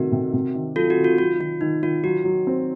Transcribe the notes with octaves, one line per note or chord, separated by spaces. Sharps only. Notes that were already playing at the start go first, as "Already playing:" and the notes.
Already playing: C3 D#3 A3 F#4 A#4
C3
C3
D#3
F#3 F4 A4
F#4
D#3
F4
F#3 F4
D#3 F4
D#3 D#4
D#3 F4
F#3 F#4
F#3
C4